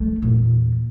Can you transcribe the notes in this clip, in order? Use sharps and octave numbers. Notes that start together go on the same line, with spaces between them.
A3
E2 A#2